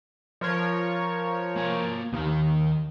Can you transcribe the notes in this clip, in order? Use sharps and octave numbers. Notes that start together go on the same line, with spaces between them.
F3 A#4 C#5
A#3 G#5
D#2 D#3 D#4